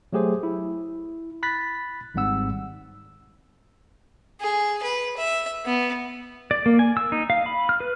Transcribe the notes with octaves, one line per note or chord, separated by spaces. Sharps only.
F#3 A3 G4 G#4 C5
E4
B5 F#6 A6 B6
G#1 G#2 G3 C4 F#5 E6
G#4
B4
E5
B3
D5
A#3
G#5
E6
D#4
F5
B5
F6
B4